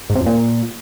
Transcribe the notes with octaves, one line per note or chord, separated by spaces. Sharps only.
G#2
C3
F2
A#2